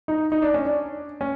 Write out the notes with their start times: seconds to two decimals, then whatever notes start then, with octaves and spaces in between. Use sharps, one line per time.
0.08 D#4
0.32 D#4
0.42 D4
0.54 C#4
0.65 D4
1.21 C#4